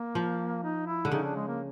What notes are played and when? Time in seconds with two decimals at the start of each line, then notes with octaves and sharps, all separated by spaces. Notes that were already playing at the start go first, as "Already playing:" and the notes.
Already playing: A#3
0.15 F3
0.63 D#4
0.87 E4
1.05 D3
1.11 C#3 D#4
1.24 D4
1.36 G#3
1.48 A#3